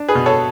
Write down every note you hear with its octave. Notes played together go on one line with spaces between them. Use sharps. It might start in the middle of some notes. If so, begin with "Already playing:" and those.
Already playing: D4
G#4 B4
B2
A4 C#5